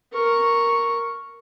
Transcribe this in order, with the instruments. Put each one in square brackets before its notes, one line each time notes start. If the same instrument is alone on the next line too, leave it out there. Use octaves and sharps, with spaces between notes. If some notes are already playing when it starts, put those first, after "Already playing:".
[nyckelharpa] A#4 C#6